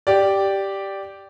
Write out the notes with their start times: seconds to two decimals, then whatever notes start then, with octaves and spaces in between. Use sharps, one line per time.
0.07 G4 D5